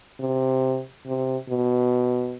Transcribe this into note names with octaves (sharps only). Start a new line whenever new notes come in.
C3
C3
B2